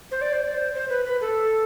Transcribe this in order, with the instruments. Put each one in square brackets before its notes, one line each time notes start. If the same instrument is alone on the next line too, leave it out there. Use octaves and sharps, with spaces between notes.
[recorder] C5
D5
C5
D5
C5
C5
B4
B4
A4